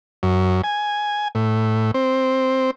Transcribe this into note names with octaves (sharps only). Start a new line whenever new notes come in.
F#2
G#5
A2
C4